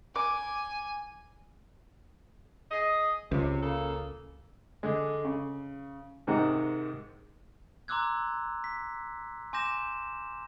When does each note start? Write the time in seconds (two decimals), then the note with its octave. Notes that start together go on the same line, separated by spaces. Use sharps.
0.16 G#5 D6
2.71 G#4 D#5
3.32 C#2 C3
3.63 C#3 A#3 A4
4.83 D3 G#3
5.24 C#3
6.27 G#2 C3 D#3 G#3 F#5 A#5
7.88 A#5 C6 D6 E6 F#6 G#6
8.64 B6
9.53 G#5 C6 D6 G6 A#6 E7